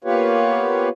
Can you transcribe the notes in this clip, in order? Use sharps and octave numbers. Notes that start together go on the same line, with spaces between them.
A#3 B3 F4 G4 B4 C#5